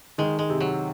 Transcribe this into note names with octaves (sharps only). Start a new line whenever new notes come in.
D#3 G#3
G#3
C3
F#3